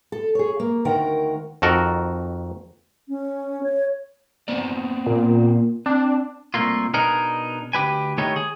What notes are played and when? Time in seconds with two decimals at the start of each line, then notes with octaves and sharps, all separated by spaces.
0.12 A4
0.35 G#4 C#5
0.60 A#3
0.85 D2 D#3 A#4 F#5 G5
1.62 F2 D#3 F#4 A4 A#4
3.09 C#4
3.63 C#5
4.48 B3 C4 D5
5.06 A#2
5.86 C4 D4
6.54 C2 F#2 A3 A#3 F4
6.94 B2 B3 D4 D#4 G#4 A#4
7.73 D2 G4 B4 G#5
8.18 D#3 A3 B3 D#4 G4 C#5
8.36 G#4